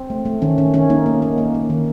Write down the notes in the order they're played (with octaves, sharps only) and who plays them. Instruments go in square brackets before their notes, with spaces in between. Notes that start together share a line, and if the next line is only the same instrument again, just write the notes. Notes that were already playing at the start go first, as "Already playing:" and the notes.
Already playing: [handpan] C4
A3
A3
D#3 C#4
D#3 C#4
D#3 C#4
A#3 D#4
A#3
A#3
A#3
A#3
D#3